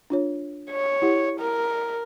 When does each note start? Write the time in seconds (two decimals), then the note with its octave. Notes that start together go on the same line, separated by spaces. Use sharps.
0.10 D4 F4 C#5
0.71 C#5
1.02 E4 G4 F#5
1.40 A#4